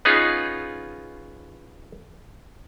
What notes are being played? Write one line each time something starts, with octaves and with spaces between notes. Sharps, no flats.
B3 C#4 D#4 F4 G#4